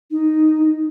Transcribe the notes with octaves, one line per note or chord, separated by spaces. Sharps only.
D#4